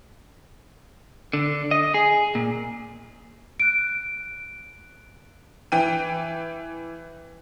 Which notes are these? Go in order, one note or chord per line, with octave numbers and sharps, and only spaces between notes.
D3
D#5
G#4
A#2
F#6 D7
E3 G5 D#7